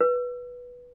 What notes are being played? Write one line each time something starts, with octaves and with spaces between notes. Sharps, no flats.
B4